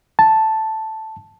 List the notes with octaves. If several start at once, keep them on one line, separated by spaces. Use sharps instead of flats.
A5